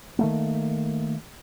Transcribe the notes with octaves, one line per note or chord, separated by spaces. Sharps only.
D#3 A3 A#3